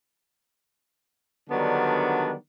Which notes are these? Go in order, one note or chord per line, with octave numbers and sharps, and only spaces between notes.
D3 D#3 F#3 G3 B3 D4